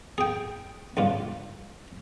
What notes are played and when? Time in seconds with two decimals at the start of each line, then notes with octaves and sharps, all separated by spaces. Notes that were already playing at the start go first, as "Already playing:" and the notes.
0.18 G#4 G5
0.97 C#2 G2 F4